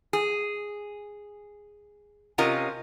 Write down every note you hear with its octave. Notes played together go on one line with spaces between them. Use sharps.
G#4
C3 C#4 F4 A#4 D#5